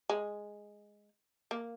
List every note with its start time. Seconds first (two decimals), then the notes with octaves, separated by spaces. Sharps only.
0.09 G#3
1.51 A#3